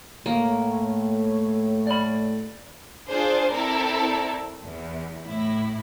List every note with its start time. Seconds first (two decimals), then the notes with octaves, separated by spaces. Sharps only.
0.26 A2 A3 A#3 C#5
1.87 D5 B5
3.08 D4 F4 G#4 C5 D5
3.53 C4 E4 A4 A#4 D5
4.63 E2
5.23 A2 E4